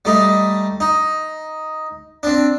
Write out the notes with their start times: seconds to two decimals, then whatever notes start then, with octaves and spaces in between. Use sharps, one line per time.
0.05 G3 A3 D#4
0.80 D#4
2.23 C4 D4